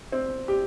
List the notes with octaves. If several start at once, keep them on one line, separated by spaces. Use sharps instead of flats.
C4
G4